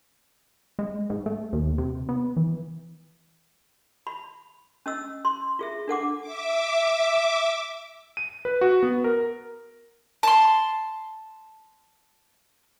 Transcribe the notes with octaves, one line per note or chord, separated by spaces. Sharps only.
G#3
G#2
A3
D#2
C3
B3
E3
B5
C#4 D#5 E6
C6
F4 G#4 E5
D4 A4 F#5 D6
E5 D6
D#7
B4
F#4
B3
A#4
A5 C6